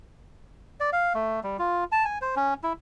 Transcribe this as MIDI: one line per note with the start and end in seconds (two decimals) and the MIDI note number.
0.80 0.90 74
0.93 1.13 77
1.15 1.40 57
1.44 1.57 55
1.59 1.84 65
1.92 2.05 81
2.05 2.18 80
2.21 2.35 72
2.36 2.54 61
2.63 2.73 64